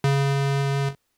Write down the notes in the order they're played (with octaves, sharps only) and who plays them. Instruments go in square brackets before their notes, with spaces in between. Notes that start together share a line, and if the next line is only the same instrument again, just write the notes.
[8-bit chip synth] C#3